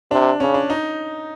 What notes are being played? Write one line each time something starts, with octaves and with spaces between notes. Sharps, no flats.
C3 D4
C#3 C#4
D4
D#4